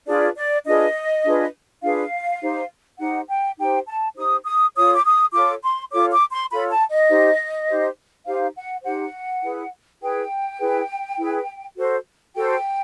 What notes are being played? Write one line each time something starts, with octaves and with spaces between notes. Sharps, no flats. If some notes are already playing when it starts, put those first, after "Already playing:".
D4 F4 G#4 B4 D5
D5
D4 F4 G#4 B4 D#5
D4 F4 G#4 B4
D4 F4 G#4 B4 F5
D#4 G4 C5
D#4 G4 C5 F#5
G5
D#4 G4 C5 G5
A5
D#4 G4 C5 D#6
D#6
F4 A4 C#5 D#6
D6
D#6
F4 A4 C#5 D6
C6
F4 A4 C#5 D6
D6
C6
F4 A4 C#5 B5
A5
D#5
D#4 G4 C5
D#4 G4 C5
D#4 G4 C5 F5
F#5
D#4 G4 C5 F#5
E4 G#4 B4
E4 G#4 B4 G5
E4 G#4 B4
E4 G#4 B4
F#4 A4 C5
F#4 A4 C5 G5